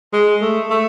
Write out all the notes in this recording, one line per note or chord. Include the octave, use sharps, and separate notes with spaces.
G#3
A3
A3